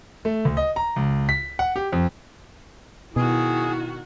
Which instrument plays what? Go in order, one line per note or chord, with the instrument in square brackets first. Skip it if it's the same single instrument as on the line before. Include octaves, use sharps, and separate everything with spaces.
[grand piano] A3
D2
D#5
A#5
C#2
B6
F#5
G4
F2
[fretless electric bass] B2 [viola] D#3 F#4 [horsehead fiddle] E4 [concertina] G#4